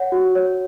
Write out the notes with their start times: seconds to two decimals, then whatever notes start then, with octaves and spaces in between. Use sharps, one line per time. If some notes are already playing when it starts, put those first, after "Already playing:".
Already playing: C#5 F#5
0.12 F#4
0.35 C#5